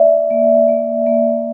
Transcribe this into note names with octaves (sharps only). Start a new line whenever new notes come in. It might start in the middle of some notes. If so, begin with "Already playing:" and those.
Already playing: A#3 D5 E5
A#3
A#3
A#3